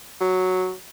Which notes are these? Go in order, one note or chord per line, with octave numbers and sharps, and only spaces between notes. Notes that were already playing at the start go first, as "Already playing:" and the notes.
F#3